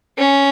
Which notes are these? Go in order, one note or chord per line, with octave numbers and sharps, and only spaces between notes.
C#4